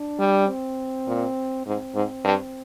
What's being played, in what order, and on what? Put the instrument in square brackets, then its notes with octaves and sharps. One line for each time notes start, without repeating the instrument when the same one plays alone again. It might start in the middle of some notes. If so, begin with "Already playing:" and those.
Already playing: [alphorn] D4
[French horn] G3
[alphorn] C4
[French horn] A#2
[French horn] G#2 [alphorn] C4
[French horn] G#2
G2